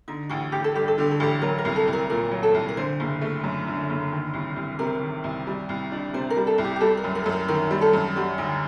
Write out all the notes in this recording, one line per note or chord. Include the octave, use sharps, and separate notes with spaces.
D3 D#4
A1 F#4
A1 G4
A4
G2 G4
A4
D3 G4
A4
A1 G4
F#3 A#4
A#4
C2
A4
C2
A#4
A#2 A#4
F#3
A4
C2
A#4
D3 C5
F#1
A3
F#2
D3
F#1
D#3
C2
C2
C3 A#4
D#3
C2
G3
C2
D4
C3 C5
A#4
G3
A4
C2
G4
G4
G3 A4
A#4
F#2
A#4
F#2 A4
A#4
D#3 A#4
G3
A4
F#2
G3 F#4
D2 D#4